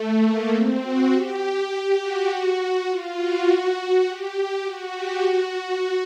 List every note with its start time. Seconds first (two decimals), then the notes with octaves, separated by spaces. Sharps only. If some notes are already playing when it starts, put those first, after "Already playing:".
Already playing: A3
0.24 A#3
0.53 C4
0.83 F#4
1.13 G4
2.00 F#4
2.89 F4
3.18 F#4
4.06 G4
4.65 F#4
4.93 G4
5.24 F#4